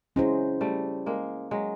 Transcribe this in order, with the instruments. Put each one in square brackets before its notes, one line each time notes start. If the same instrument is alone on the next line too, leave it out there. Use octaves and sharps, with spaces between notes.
[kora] F#3 G#3 [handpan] C#4 E4 G#4 C5
[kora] G3 A3
G#3 A#3
F#3 G#3